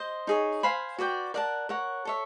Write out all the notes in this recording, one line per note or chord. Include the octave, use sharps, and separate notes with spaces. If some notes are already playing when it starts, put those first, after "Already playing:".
Already playing: C5 D#5
D#4 G#4 C#5
C5 F5 G#5 B5
F#4 B4 D5 G5
A#4 D5 F#5 A5
A#4 C#5 F#5
A4 C#5 E5